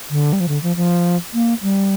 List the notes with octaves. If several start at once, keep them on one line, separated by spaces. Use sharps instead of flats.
D3
G3
F3
D3
F3
F3
A#3
G3